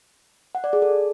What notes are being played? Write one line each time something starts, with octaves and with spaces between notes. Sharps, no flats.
F#5
D5
G#4
A4